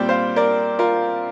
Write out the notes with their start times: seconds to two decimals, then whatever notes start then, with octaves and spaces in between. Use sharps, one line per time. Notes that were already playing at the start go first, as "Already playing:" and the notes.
Already playing: A#2 G3 C4 D5 G5
0.09 C5 F5
0.36 A#4 D5
0.79 F4 A#4